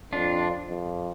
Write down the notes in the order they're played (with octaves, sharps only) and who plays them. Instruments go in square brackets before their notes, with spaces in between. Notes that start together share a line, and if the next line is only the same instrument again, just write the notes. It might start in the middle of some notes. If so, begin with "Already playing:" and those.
[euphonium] F2 [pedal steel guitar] D4 F4
[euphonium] F2